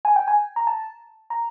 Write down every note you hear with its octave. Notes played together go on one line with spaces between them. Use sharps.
G#5
G5
G#5
A#5
A5
A#5